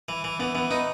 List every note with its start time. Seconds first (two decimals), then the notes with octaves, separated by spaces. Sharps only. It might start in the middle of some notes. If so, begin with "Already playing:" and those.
0.09 E3
0.24 E3
0.39 E3 B3
0.55 E3 B3
0.71 B3 D#4